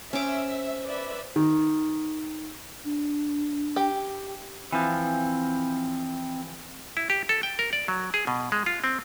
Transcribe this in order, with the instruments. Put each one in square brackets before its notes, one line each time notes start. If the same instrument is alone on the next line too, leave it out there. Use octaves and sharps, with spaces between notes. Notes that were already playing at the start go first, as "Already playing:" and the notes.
[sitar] C4 [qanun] C#4 D6 [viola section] E5
[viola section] B4 D5 E5
[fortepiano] D#3
[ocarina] D4
[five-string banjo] G4
[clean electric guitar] E3 F3 [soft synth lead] C4
[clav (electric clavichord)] E4
G4
A4
G5
A#4
D5
F#3
G#4
B2
G#3
F4
C4